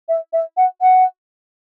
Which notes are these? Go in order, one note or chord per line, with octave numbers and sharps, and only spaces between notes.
E5
E5
F#5
F#5